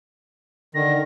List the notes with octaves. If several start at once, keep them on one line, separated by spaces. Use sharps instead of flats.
D3 D#3 A#6